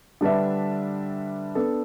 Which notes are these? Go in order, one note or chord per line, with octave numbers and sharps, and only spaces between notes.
D3 G3 D4 B4 E5
B3 D4 A4